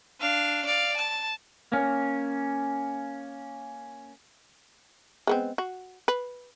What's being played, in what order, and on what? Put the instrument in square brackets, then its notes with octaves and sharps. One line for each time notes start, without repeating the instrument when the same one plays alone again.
[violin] D4 F5
D5 F5
A5
[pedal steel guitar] A#3 C#4
[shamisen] G#3 B3 C4
F#4
B4